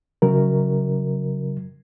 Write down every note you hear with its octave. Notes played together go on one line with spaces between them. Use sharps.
C#3 F#3 A#4